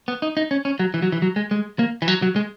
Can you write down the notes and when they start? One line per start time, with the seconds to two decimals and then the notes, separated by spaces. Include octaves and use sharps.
0.08 B3
0.22 D#4
0.37 D#4
0.51 C#4
0.65 C#4
0.79 F#3
0.94 E3
1.02 F#3
1.12 E3
1.22 F#3
1.36 G#3
1.51 G#3
1.79 A#3
2.02 E3
2.08 F#3
2.22 F#3
2.36 G#3